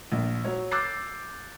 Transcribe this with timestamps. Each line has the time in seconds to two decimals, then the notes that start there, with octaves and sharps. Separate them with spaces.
0.12 A#1
0.44 F#3 C#5
0.71 D6 E6 F#6 G6 A6 C7